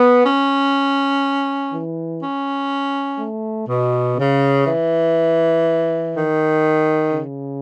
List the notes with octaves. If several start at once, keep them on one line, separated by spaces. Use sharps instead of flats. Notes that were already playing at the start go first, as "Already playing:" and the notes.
Already playing: B3
C#4
E3
C#4
A3
B2
C#3
E3
D#3
C#3